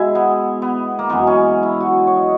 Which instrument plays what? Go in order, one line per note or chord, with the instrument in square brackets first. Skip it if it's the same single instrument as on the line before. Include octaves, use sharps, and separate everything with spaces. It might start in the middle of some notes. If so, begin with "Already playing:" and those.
Already playing: [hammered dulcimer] B2 G#3 E4 G#4
B3
B3
A#3
F#2 E3 G#3 B3
C#4
E4
F#4
C#5
D#5